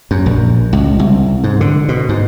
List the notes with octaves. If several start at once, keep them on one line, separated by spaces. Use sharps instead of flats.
F#2
A#1
C#2
C2
G#2
D3
B2
G#2